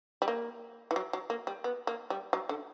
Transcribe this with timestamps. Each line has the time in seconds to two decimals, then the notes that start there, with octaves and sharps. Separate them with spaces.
0.22 G3
0.28 A#3
0.91 E3
0.96 F#3
1.13 F#3
1.30 A#3
1.47 G3
1.64 B3
1.87 A#3
2.10 G3
2.33 F#3
2.49 D3